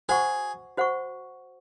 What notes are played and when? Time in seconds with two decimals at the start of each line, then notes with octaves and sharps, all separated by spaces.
0.09 F#4 G#4 C5 F#5 C#6
0.77 F#4 C5 F#5 C#6